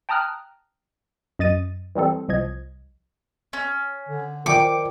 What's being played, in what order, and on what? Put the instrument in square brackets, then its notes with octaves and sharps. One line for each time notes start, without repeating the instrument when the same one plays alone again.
[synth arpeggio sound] G5 A5 A#5 D#6 F6 F#6
F#2 D#5 A6 D#7
E3 G3 C4 A4
C2 F3 D#5 G#6
[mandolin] C#4
[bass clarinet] D3
[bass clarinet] D#3 [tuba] F3 [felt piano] D5 G5 C#7 [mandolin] D6